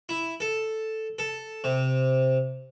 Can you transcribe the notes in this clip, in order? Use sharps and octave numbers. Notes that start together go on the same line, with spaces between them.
E4
A4
A4
C3